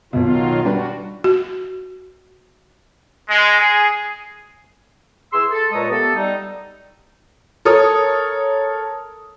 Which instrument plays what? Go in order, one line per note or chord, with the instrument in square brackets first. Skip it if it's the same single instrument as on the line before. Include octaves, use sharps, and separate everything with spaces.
[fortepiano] B1 B2 [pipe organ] D#3 F#3 F4
[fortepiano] G3 D4 B4 [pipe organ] F#4
[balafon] F#4
[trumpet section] G#3
G#4
[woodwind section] E3 G#4 C6 E6
A4
A#2 G#3 B4 C#5 A#5 D#6
A3 B3 G4 A4
G3 D#4
[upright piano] A4 A#4 C#5 D#6